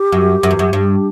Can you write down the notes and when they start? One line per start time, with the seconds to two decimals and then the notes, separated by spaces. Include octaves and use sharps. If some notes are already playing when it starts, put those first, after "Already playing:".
Already playing: G4
0.12 F#2
0.43 F#2
0.51 E2
0.59 F#2
0.73 G2